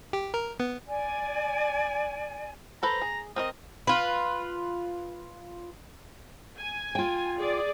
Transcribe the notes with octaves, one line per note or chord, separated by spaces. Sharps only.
G4
A#4
B3
D5 G#5
A4 B4 C5 A#5
G#4
C4 A#4 D#5 D#6
F4 B4
G#5
F4 G5
G#4 D5